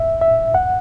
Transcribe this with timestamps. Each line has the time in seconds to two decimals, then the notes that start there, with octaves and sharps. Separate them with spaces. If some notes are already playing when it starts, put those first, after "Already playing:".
Already playing: E5
0.21 E5
0.54 F#5